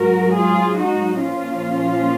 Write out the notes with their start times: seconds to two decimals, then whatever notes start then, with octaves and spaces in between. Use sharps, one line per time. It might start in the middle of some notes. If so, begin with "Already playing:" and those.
Already playing: G#2 F#3 F#4 A#4
0.33 F4 G#4
0.76 D#4 F#4
1.18 A#2 F3 C#4 F4